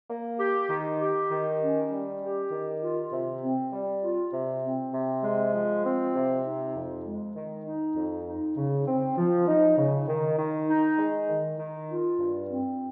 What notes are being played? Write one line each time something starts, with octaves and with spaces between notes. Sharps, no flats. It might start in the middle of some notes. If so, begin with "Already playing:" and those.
A#3
G4
D#3
G4
D#3
C#4
G3
G4
D#3
F4
C3
C4
G3
F4
C3
C4
C3
G#3
F3
C4
C3
D#4
F2
G#3
D#3
D#4
F2
D#4
C#3
C4
F3
D#4
C#3
D#3
D#3
D#4
G#3
D#3
D#3
F4
G2
C4